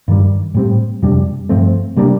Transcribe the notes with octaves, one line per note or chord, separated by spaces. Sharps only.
G2 D#3 G3
A2 G3 C4
F2 C3 G3 D4
G2 F3 A3 C4
C3 G3 A#3 D4